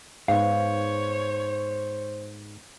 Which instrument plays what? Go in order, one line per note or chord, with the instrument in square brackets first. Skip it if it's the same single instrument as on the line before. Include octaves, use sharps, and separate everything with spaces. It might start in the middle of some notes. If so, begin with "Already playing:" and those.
[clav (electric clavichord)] G#2 B3 [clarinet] C5 [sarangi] C#5 [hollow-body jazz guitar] F5